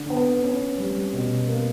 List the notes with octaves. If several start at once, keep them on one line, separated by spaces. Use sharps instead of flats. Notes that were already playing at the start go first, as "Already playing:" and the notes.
Already playing: D3
B3
C#4
G3
B2
A#3